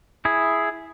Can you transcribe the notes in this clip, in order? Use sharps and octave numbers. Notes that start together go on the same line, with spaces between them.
E4 G#4